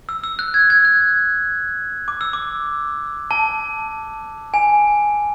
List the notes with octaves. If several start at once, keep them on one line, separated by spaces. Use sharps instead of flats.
E6
E6
F#6
G#6
G#6
F#6
D6
E6
D6
A5
G#5